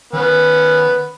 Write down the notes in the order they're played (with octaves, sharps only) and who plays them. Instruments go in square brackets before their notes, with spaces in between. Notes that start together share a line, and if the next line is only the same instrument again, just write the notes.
[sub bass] D#3 [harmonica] B3 C#4